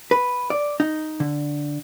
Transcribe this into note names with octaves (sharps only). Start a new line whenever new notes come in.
B4
D5
D#4
D3